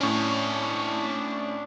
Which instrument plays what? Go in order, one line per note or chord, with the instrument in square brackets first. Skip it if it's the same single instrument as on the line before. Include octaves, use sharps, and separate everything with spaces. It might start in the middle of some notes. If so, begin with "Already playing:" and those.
[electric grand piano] A2 C#4 [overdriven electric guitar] D4 C#5